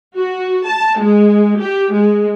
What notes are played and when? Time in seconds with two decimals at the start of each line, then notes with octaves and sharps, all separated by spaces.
0.15 F#4
0.67 A5
0.98 G#3
1.59 G4
1.93 G#3